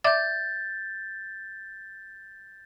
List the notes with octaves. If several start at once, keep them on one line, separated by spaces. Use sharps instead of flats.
D5 E5 D6 G6 A6